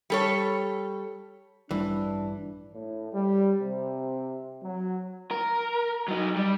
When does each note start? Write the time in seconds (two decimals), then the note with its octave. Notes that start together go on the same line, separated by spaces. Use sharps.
0.10 G3 A4 C#5
1.71 A1 G2 E3 G3 D4
2.73 A2
3.13 G3
3.60 C3
4.62 F#3
5.31 A#4
6.08 F#3 D#4
6.36 G3